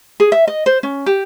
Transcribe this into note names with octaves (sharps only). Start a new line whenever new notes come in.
G#4
E5
D#5
C5
C#4
G4